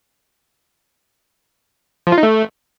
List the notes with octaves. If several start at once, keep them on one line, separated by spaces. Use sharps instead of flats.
F3
F4
D#4
A3